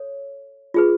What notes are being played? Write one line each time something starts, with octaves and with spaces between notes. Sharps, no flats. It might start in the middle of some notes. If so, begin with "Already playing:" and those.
Already playing: A4 C#5
F4 G#4 B4